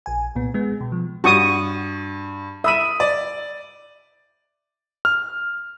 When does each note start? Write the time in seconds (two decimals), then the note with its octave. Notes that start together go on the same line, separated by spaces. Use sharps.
0.06 A#1 G#5
0.35 C2 A#2 B3
0.54 G#3 B3
0.81 B2
0.92 F3
1.24 G2 F#4 C#6 D#6
2.64 E5 B5 D#6 D#7
3.00 D5
5.05 F6